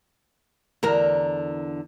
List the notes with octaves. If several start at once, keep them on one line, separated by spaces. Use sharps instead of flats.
E2 D3 A#4